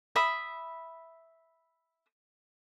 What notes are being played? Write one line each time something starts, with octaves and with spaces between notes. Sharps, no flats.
E5 B5 D#6